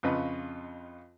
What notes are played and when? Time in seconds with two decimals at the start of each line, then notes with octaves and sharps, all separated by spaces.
0.03 F2 C#3 F4 B4 D#5